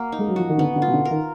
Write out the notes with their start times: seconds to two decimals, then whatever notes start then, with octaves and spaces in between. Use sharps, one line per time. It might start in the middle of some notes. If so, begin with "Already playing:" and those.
Already playing: A#3 F#4 A#4
0.12 D#4
0.19 G#3
0.28 F#3
0.36 F3 F#4
0.49 D#3
0.58 D3 B3
0.76 D3
0.82 F4
0.88 B2
0.93 D3
1.05 A#4
1.10 D#3